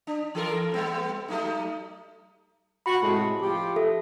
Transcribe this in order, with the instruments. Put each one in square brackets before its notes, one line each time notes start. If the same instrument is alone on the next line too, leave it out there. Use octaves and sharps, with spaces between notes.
[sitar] D4
E3 A4 A#4
G3 B3 C4
F#3 A3 D#4
[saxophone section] F#4 [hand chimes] B5
[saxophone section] A2 C3 G#3
F3 G4
[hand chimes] A4 E5